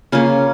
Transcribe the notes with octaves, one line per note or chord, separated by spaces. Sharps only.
C#3 A#3 C#4 F4